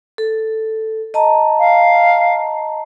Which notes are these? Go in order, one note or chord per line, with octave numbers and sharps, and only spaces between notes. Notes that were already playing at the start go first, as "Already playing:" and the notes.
A4
D#5 A5 A#5
F5